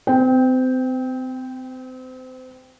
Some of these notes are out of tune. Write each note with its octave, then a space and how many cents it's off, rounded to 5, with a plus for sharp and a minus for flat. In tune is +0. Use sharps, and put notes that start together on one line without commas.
C4 -30 G5 +0